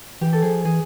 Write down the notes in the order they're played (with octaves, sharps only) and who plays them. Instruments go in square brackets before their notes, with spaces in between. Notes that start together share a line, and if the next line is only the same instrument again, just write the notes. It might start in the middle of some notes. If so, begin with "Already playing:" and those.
[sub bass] E3 [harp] G4
[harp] A4
[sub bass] F3 [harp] G#4
[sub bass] E3 [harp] G#4